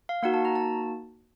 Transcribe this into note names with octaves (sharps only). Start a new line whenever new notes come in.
F5
A#3 D#4 F#4 F#5
A5
A#5
A5